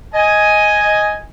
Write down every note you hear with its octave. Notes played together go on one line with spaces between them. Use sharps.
D#5 G#5